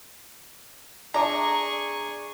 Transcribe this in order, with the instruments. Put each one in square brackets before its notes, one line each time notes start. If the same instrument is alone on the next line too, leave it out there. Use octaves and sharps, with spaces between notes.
[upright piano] D4 E5 D6 [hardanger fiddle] G#4 C#6 [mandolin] A#5